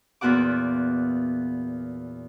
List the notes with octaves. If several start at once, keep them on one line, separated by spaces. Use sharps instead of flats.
E2 A#2 B3 F#4 F#5 D6